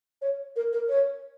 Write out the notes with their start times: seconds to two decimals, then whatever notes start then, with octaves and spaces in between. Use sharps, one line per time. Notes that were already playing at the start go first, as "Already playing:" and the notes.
0.22 C#5
0.56 A#4
0.73 A#4
0.89 C#5